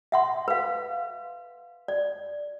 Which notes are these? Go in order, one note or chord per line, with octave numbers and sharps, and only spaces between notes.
E5 F#5 C6
B4 F5
D5